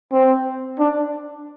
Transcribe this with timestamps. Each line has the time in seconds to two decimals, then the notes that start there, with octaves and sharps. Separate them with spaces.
0.12 C4
0.79 D4